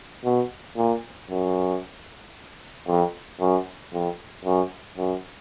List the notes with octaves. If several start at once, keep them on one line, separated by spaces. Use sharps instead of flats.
B2
A#2
F#2
F2
F#2
F2
F#2
F#2